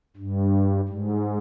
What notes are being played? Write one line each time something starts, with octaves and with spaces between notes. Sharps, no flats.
G2
G#2